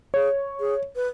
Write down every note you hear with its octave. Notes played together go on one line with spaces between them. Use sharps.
G#4 C#5
G#4
B4